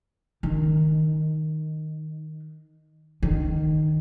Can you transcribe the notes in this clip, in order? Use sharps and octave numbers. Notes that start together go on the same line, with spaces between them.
D#3
D#3